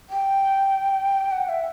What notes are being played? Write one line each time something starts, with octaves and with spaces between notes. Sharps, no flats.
G5
F#5
E5